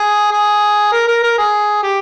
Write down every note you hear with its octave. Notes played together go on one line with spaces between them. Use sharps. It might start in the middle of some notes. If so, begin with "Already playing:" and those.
Already playing: G#4
G#4
A#4
A#4
A#4
G#4
G4